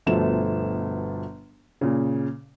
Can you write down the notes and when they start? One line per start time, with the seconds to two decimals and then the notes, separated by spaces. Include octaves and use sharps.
0.06 G1 B2 F3 A3 E7
1.81 A#2 C#3